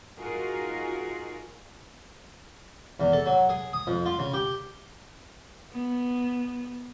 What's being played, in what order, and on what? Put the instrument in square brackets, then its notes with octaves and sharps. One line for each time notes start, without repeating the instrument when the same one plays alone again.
[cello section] D#4 F4 F#4 G#4 A#4
[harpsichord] E2
A4
F#3
G#4
D#6
F2
F4
C#3
G4
[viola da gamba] B3